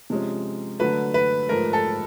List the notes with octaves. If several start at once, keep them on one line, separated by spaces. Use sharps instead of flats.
C3 F3 G#3 C#4
D3 F#3 A3 B4
B4
G#2 F3 A3 A#4
A4